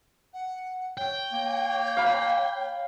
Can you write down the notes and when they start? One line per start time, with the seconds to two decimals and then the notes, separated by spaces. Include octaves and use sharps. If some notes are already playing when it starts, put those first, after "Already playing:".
0.34 F#5
0.97 C#5 G5
1.33 A#3
1.97 F5 B5